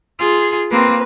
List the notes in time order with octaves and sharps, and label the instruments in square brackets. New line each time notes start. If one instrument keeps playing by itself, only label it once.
[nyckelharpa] F4 [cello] G#4
[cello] A#3 C4 [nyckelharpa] B4